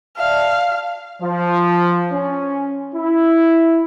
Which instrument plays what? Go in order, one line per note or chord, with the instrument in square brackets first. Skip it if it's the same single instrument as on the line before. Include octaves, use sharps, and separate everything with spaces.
[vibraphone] D5 E5 A5 [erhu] F5
[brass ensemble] F3
C#4
E4